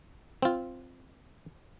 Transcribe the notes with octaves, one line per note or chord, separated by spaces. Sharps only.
C4 F4